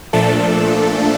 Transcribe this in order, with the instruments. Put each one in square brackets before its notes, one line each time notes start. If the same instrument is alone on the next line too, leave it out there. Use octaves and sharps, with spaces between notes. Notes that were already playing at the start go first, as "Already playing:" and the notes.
[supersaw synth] A#2 F3 A3 D4 A4